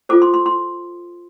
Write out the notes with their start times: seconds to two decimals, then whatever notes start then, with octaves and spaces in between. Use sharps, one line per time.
0.09 F4 A4 C5 D6
0.22 C6
0.34 C6
0.46 C6